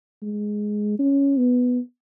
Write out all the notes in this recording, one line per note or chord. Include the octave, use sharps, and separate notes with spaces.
G#3
C#4
B3